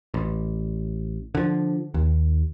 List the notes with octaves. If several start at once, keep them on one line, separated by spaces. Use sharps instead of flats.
A1
D3 F3
D#2